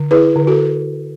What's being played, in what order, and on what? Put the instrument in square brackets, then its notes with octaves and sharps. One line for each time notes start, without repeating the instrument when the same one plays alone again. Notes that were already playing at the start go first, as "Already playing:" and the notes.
Already playing: [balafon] D3
E4 G#4 B4
D3
F#4 A4